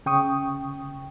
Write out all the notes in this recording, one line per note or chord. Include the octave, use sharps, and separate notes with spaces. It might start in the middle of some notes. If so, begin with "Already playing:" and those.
C#3 G5 C#6 D#6